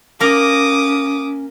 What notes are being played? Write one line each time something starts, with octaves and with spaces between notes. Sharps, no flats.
A#3 C#4 A#4 D6 D#6